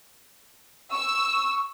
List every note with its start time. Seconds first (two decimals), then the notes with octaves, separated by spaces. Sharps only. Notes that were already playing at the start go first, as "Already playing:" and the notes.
0.91 C#6 E6